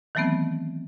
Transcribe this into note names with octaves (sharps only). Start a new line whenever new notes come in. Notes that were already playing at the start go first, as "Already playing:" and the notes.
D#3 E3 F#3 A3 B3 C4